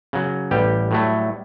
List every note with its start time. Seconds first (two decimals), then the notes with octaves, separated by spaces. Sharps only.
0.13 C#3 F#3
0.51 A1 G3 G4
0.91 A2 F#3 A3